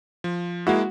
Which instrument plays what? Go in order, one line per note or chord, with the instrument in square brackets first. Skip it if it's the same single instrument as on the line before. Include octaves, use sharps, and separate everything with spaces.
[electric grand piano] F3
[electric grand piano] G#3 A#3 E4 [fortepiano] F#4